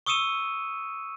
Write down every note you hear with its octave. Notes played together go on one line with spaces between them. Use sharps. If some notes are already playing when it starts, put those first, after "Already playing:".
C#6 D#6 E6 C#7 D#7 E7